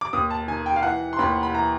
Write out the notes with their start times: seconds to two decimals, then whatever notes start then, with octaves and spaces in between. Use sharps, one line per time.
0.01 D6
0.13 D#2 D#6
0.31 A5
0.47 D#3 G#5
0.66 G5
0.76 F5
0.83 E3 F#5
1.13 C6
1.19 D#2 B5
1.43 B5
1.53 E3 A#5